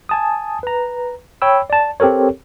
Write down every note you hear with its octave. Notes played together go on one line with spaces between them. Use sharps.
G#5 A5 D#6
B4 A#5
C#5 G5 B5 E6
D5 A5
C4 G4 A4 A#4 C#5